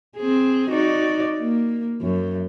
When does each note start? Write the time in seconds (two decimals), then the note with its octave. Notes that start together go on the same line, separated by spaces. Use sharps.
0.17 C4 G#4
0.70 D#4 F#4 D5
1.41 A#3
2.01 F#2